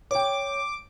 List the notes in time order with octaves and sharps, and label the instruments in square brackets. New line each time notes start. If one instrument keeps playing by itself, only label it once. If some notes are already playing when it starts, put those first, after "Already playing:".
[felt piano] C#5 G5 [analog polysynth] D6